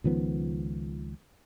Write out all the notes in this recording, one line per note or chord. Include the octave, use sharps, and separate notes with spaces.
C#2 D#3 F3 B3